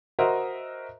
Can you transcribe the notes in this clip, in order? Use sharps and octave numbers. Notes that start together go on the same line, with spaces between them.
F#4 A#4 C5 D#5 E5